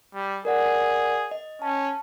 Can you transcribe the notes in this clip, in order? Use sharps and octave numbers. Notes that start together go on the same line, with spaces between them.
G3
G#4 A#4 D5 F#5
D#5
C#4 A5